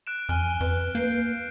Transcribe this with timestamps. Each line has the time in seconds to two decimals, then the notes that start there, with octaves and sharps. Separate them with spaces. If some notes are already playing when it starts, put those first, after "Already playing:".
0.07 F#6 D7 E7
0.29 F2 G#5 F6 G7
0.60 F2 B4
0.95 A#3 G6 C7 D7